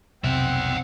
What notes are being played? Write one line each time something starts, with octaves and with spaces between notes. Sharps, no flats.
B1 F2 C3 C4 E5 F#5